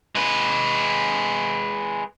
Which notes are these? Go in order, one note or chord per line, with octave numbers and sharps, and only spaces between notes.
G#3 B4